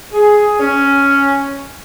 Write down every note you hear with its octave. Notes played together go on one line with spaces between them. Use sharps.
G#4
C#4